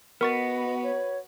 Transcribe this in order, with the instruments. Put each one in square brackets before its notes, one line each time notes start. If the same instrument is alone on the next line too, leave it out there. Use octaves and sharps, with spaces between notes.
[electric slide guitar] B3 [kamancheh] F#4 B4 [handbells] A#4 C#6 A6 [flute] D#5
[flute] C#5